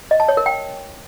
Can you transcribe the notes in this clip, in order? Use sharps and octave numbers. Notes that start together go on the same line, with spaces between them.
D#5
A5
C#5
A#4
G5